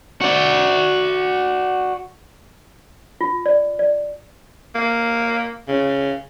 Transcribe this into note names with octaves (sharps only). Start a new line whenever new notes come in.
F#4 D5
F4
D5
D5
A#3
C#3